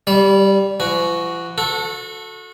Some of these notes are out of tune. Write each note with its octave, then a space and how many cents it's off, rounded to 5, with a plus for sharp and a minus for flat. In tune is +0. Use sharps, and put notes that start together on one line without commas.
G3 +0 D5 -35
F3 -45 F#4 +0
F#4 -30 A4 +0